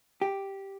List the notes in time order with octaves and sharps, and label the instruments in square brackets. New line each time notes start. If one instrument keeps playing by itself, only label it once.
[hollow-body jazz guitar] G4